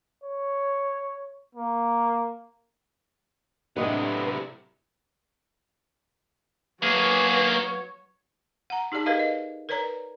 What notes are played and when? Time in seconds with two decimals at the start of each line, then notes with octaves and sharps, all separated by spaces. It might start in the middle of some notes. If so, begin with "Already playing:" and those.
0.24 C#5
1.55 A#3
3.77 A2 C3 F#3 G#3 D4 E4 B4 D#5
6.83 F#3 A#3 G#4 B4 C#5
8.70 F#5 A#5
8.92 D#4 G4 G#4 D5 A5
9.06 G#4 A#4 B4 D5 D#5 F5
9.19 D#5
9.69 A#4 B4 C#5 D5 A#5